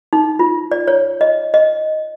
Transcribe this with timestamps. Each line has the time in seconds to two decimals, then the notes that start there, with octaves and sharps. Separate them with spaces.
0.13 D#4
0.39 F4
0.72 D5
0.88 C#5
1.21 D#5
1.54 D#5